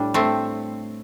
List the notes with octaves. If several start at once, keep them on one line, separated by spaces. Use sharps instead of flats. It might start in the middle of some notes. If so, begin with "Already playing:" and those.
Already playing: A2 G3 D4
A3 C4